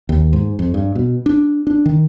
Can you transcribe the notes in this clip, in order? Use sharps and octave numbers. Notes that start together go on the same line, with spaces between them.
D#2
G#2
F2
G2
B2
D4
D4
D#3